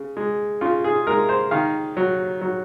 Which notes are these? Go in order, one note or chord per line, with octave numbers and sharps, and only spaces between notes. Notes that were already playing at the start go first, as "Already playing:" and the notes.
Already playing: C#3
G#3
C#3 F4
G#4
G#3 A#4
C5
D#3 F5
F#3
F#3